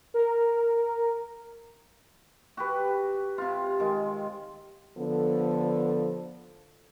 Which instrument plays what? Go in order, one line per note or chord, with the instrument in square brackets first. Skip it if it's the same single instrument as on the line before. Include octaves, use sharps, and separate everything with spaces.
[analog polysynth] A#4
[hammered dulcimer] F#4 G4 B4
C3 F4
D#3 G#3
[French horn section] D3 F3 B3 A4